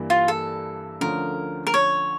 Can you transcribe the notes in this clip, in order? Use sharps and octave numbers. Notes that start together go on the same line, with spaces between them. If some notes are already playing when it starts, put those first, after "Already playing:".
Already playing: G2 E3 G3 A#3 E4
F4
A4
D2 D3 F3 C#4 A#4
A#4
C#5